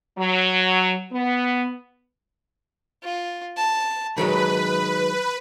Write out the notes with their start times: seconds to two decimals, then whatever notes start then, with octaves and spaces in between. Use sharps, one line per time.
0.18 F#3
1.13 B3
3.03 F4
3.58 A5
4.18 D#3 F#3 G#3 B4 B5